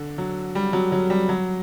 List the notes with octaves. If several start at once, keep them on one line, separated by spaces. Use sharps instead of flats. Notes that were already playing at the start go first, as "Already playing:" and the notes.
Already playing: D3
F#3
G3
F#3
F#3
G3
F#3